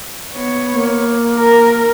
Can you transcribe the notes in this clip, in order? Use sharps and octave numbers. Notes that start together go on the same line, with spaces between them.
B3 C#5
A#3
A#4